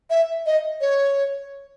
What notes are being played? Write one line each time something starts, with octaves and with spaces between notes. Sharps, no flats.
E5
D#5
C#5